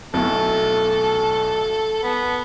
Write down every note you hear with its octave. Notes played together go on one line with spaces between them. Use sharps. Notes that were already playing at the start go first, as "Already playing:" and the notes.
B1 B2 A3 E4 A4
B3